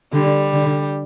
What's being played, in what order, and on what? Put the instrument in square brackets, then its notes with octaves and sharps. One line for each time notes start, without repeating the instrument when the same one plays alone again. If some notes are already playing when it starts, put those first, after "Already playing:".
[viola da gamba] D3 [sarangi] G3
[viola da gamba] D3